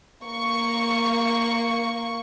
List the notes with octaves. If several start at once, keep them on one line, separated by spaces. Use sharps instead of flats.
A#3 C#6